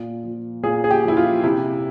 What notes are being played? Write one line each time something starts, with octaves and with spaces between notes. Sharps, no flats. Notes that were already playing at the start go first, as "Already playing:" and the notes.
Already playing: A#2
F3
A#2 G#4
G#4
G4
F3 E4
F4
C3 E4